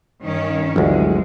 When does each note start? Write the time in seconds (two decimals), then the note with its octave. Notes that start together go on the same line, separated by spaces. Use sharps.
0.23 G2 D#3 C#4
0.76 G1 D2 E3 F#3 G#3 F#4